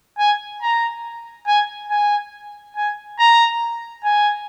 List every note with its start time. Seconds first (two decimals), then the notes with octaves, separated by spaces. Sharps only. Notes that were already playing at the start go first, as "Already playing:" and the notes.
0.19 G#5
0.62 A#5
1.47 G#5
1.91 G#5
2.77 G#5
3.19 A#5
4.05 G#5